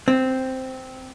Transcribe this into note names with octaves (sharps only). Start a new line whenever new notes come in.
C4